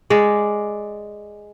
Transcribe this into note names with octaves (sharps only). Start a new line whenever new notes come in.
G#3 D5